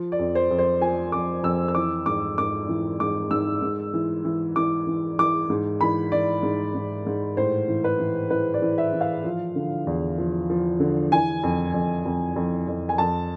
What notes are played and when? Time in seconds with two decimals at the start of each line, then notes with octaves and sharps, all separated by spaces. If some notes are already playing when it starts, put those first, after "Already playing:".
Already playing: F3
0.12 D5
0.19 F2
0.35 C5
0.51 F2
0.59 C5
0.81 F3 G#5
1.12 F2 D6
1.43 F2 E6
1.68 E6
1.75 E3 D6
2.06 G#2 D6
2.38 G#2 D6
2.69 E3
3.00 G#2 D6
3.31 G#2 E6
3.62 G#2
3.94 E3
4.25 E3
4.56 E3 D6
4.87 E3
5.19 E3 D6
5.50 G#2
5.81 E3 B5
6.12 E3 D5
6.43 G#2
6.75 G#2
7.06 G#2
7.37 A2 C5
7.68 E3
7.84 B4
7.99 E3
8.30 E3 B4
8.54 D5
8.62 E3
8.78 E5
8.93 E3
9.01 F5
9.24 F3
9.55 D3
9.87 E2
10.18 F3
10.50 F3
10.80 D3
11.11 E3 G#5
11.43 F2
11.74 F2
12.05 F2
12.36 F2
12.68 F2
12.89 G#5
12.98 F2 A5